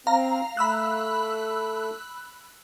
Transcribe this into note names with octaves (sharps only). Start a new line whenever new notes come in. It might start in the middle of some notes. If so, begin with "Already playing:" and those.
C4 F5 A#5
A3 B5 E6 F#6